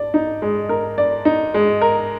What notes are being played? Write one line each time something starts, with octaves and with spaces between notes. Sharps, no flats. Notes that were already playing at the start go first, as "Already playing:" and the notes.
Already playing: D5
D#4
G#3
A#4
D5
D#4
G#3
A#4